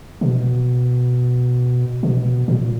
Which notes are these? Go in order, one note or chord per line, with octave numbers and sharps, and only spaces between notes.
B2
B2
A#2